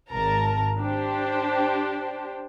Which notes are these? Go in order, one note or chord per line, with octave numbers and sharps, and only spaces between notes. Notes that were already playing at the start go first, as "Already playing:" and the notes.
G#1 A#4 A5 A#5
D4 G4 C5